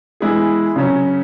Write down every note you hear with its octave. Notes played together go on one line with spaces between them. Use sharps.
E3 G#3 B3 E4 G#4
C#3 F#3 C#4